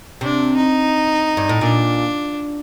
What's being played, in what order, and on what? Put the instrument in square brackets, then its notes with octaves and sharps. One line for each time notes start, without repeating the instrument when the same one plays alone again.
[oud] C3 [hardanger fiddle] D4
[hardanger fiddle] D#4
[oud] G2
A2
[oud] A#2 [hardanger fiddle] D4